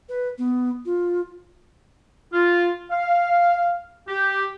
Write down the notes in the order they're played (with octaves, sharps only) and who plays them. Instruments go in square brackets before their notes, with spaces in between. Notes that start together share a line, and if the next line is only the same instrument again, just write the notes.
[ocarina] B4
B3
F4
[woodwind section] F4
F5
G4